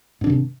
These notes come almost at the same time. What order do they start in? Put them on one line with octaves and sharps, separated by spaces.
G#2 D4 D#3 C3